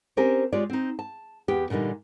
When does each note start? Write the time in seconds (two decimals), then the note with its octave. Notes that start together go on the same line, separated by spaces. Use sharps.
0.17 C4 C#4 G4 A#4 C5 G#5
0.53 G#3 F4 G4 C#5 D5
0.70 C4 D#4
0.99 A5
1.48 E2 B3 G4
1.70 A#2 D3 E3 G3 D#4